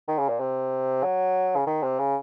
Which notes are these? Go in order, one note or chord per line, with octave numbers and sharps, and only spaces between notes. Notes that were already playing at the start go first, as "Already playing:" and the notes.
D#3
C#3
A#2
C3
F#3
C#3
D#3
C3
C#3